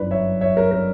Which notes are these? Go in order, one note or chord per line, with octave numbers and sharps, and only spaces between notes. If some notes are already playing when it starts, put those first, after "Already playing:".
Already playing: G1 F#2 E3 B4 D5
C#5 E5
C#5 E5
A#4 C#5
A#4 C#5